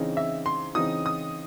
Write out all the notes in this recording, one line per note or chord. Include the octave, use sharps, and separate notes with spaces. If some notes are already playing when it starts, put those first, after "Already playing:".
Already playing: C#3 E3 C4 D#4
E5
C6
C#3 E3 C4 D#4 D#6
D#6